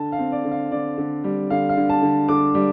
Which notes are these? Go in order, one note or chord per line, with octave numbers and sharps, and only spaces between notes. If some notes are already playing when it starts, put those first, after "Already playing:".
Already playing: D3 A5
F5
C4
D5
D3
F5
D3 D5
D3
G3
D3 F5
F5
D3
A5
D3
D3 D6
G3